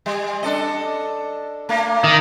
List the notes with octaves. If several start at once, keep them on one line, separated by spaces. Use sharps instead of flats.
G3
D4 A4 D#5
A3 A#3
D#3